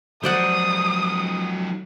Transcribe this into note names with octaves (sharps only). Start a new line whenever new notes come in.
F3 F#3 D#4 C5 D5 F#5 D#6